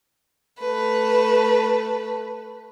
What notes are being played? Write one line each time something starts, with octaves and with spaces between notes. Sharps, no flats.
A3 B4